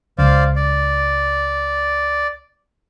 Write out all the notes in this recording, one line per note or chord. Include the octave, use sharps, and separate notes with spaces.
C#2 C5 D5 F5
D5